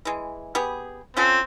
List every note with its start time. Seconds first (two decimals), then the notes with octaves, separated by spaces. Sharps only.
0.05 E3 G#3
0.55 B3 G4 G#4
1.17 C4 C#4 F4 A4